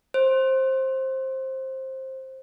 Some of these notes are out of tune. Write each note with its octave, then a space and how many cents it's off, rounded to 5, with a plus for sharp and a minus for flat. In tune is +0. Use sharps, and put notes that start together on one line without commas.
C5 +15